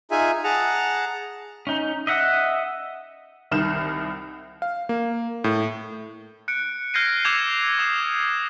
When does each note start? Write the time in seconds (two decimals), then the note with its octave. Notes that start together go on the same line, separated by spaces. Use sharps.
0.11 D#4 F4 G#4 E5 G#5
0.44 G#4 F#5 A5 A#5
1.67 C#4 D#4
2.07 D#5 E5 F#5
3.51 C2 D#3 F6 G6 E7
4.62 F5
4.89 A#3
5.44 A2
6.48 F#6 C#7 D7
6.94 F6 G6 G#6 A#6 C7 D#7
7.25 D6 E6 G6 G#6 E7 F7
7.78 D6 D#6 E7